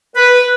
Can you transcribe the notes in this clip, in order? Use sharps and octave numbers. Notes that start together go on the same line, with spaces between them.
B4